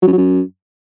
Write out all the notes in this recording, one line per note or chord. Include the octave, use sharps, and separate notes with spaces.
F#3
F#2
F#3
F#2